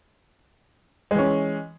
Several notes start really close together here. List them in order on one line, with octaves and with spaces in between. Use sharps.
G#3 E3 C#4